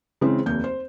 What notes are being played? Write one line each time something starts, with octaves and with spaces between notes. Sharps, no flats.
C#3 E3 G#3 C4
F1 D#2 G6
C5